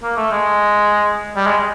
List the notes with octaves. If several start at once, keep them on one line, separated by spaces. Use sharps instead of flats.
A#3
A3
G#3
G3
G#3